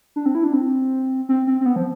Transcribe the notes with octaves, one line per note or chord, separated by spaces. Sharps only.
D4
C4
E4
D4
C4
C4
C4
C4
B3
F3